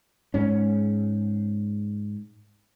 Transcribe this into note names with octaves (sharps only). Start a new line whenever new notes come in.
G#2 C#4